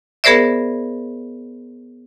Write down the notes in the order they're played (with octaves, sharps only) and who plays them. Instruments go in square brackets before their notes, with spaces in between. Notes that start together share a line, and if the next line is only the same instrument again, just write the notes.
[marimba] B3 G#4 A#4 C5 D5 E5